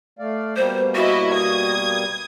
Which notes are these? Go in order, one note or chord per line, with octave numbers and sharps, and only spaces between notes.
A3 D5 F5
B2 G3 A#3 C5
E4 F#4 D#5
D#6 G#6